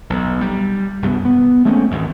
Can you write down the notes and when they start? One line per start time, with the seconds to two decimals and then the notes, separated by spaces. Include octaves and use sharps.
0.10 B1
0.41 G3
1.02 C2 G2 F#3 B3
1.25 B3
1.65 G#3 A3 C4 C#4
1.91 G#1 E2 G#2